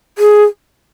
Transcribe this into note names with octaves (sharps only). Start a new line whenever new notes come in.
G#4